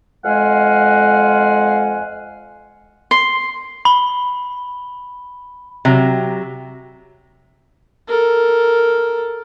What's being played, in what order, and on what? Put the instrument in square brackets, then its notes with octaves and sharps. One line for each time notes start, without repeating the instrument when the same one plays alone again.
[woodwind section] F2 G#3 F5 F#5 G#5
[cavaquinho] C6
[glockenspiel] B5 G7
[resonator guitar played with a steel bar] C3 F#3
[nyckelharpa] A4 A#4